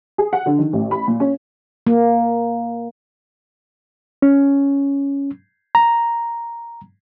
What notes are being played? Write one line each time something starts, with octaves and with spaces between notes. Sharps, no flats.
G#4
F#5
D3
D#3
A1
B5
A#2
C#4
A#3
C#4
A#5